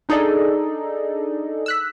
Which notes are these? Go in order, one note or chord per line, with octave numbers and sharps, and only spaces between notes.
D4 D#4 G#4 A4 D5 D#5
E6 F#6 B6